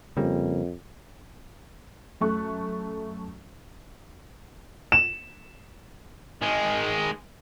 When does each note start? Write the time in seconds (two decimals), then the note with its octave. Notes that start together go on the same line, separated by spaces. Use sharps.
0.17 F2 C#3 G3 A#3
2.21 F#2 A3 C#6 F#6
4.92 E7
6.42 D#3 G#3